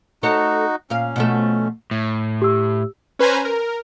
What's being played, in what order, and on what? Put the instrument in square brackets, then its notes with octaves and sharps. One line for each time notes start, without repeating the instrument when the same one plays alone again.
[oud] A3 A4 C#5 [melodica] D#4 F#4
[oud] A#2 F5 [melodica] C#4
[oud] B2 F3 A3
[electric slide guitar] A2
[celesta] G4 E6
[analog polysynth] C#4 B4 C5 G#5 A#5
A#4